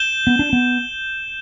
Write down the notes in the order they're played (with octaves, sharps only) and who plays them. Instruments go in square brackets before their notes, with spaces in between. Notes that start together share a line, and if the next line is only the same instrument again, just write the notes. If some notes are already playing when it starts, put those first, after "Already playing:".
Already playing: [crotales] G6 E7 G7
[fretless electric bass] B3
D4
B3